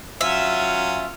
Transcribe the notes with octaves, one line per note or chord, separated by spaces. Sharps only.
F#3 C#4 F4 E5